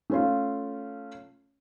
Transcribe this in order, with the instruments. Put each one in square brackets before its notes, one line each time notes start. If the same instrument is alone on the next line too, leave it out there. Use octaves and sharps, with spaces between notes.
[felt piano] A3 C#4 F4